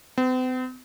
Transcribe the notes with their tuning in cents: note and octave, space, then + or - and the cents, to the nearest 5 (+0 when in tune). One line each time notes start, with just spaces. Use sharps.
C4 -45